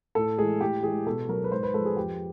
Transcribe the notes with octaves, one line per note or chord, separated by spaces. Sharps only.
A2 A4
E3 G#3 G#4
A2 G4
E3 G#3 G#4
B2 A4
F#3 A#4
B4
G#2 C5
B4
F3 G#3 A4
G#4
F2 G4